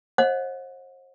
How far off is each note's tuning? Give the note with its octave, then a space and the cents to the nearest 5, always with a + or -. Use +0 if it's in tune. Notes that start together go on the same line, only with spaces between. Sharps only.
C5 +35 D#5 +0 F#5 -35